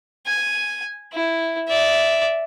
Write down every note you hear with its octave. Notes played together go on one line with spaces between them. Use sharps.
G#5
E4
D5 E5